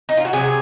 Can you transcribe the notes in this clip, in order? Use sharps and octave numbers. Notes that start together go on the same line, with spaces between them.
D#4
F4
F#4
C3 F#3 G#4